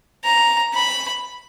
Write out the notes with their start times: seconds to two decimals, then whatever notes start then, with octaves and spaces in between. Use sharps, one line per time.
0.25 A#5
0.74 B5